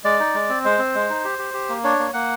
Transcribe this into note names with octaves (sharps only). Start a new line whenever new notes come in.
G#3 D5
D#4
G#3
C4
G#3 C5
C4
G#3
D#4
G4
G4
G4
A#3
D4 C#5
A#3
A#3 F#5